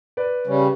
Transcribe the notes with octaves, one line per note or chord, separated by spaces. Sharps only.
B4 D5
C#3 G3 C#4